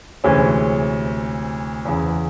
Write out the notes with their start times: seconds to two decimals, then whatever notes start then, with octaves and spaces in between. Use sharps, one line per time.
0.24 D2 C3 E3 G#3 C#4
1.85 E2 C#3 E3